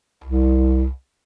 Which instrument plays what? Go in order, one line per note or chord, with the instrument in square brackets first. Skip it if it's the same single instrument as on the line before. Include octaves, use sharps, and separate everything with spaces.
[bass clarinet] C2